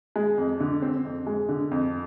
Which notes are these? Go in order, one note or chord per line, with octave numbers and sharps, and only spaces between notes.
G#3
F2
D3
C4
F2
G#3
D3
F2